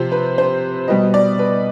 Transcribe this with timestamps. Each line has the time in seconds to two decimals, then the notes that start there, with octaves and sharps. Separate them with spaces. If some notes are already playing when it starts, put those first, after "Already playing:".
Already playing: C3 F3 C4 C5
0.12 B4
0.38 C5
0.88 B2 G3 B3 D#5
1.14 D5
1.39 B4